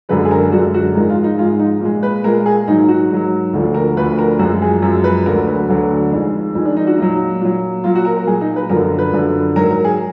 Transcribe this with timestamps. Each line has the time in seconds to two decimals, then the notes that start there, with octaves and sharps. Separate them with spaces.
0.09 F#2 D3 G#3 B4
0.25 G#4
0.31 A#4
0.52 F#2 D3 G#3 F#4
0.74 F#4
0.95 G#2 F3 G#3 A#4
1.10 F4
1.24 D#4
1.38 G#2 F3 G#3 F4
1.59 D#4
1.81 A#2 G#3
2.03 B4
2.24 A#2 G#3 A#4
2.46 G#4
2.67 G#2 D#3 F#3 D#4
2.88 F#4
3.11 G#2 D#3 F#3
3.53 D2 D3 F3
3.74 A#4
3.97 D2 D3 F3 B4
4.19 A#4
4.39 F#2 F3 G#3 F#4
4.62 G#4
4.82 F#2 F3 G#3
5.04 B4
5.26 D2 D3 F#3 A#4
5.47 B4
5.68 D2 D3 F#3
6.12 F2 D#3 G#3
6.55 F2 D#3 G#3
6.65 D4
6.76 D#4
6.87 F#4
6.98 A#2 F#3 D#4
7.40 A#2 F#3
7.84 A#2 F#3 F4
7.95 F#4
8.05 A#4
8.16 A#4
8.27 A#2 F#3 G#4
8.41 D#4
8.56 B4
8.69 F#2 D3 F3 A#4
8.85 A#4
8.99 B4
9.13 F#2 D3 F3
9.56 G#2 F#3 A#4
9.71 A#4
9.84 G#4